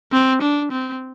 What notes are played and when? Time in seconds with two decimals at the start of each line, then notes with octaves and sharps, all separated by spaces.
0.12 C4
0.42 D4
0.72 C4